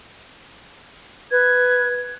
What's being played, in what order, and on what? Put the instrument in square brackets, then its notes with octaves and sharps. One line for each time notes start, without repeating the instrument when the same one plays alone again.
[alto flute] B4 [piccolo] G#6